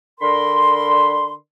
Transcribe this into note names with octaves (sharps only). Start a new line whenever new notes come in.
D3 D4 A#4 B5 C6